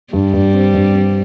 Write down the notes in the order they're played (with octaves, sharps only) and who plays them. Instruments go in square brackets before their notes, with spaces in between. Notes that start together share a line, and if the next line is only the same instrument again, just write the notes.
[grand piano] G2 [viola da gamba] G3
[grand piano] G2
C4
G2
C4